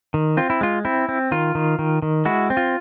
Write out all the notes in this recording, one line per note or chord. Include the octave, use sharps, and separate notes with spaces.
D#3
C4 F4
E4
G#3 F4
C4 E4
C4
D#3 F4
D#3
D#3
D#3
G#3 E4 F#4
C4
F4